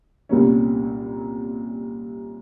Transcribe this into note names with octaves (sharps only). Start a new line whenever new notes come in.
C2 A#2 G3 A#3 C#4